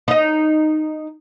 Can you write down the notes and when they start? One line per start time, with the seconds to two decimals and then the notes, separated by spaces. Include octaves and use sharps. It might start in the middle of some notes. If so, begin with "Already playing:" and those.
0.08 D#4 D#5